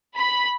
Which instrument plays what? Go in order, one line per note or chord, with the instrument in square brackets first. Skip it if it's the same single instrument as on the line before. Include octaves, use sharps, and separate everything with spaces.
[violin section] B5